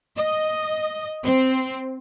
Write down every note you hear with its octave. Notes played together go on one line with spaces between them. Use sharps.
D#5
C4